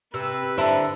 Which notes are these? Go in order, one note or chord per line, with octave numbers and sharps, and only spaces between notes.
C3 B4 E6
D3 E4 C5 A5 A#5